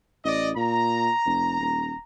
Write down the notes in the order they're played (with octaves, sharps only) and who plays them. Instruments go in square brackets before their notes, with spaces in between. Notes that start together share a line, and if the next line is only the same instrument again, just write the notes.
[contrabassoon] A1 [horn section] D5 D#5
[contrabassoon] A#2 [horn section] A#5
[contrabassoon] F1
D#1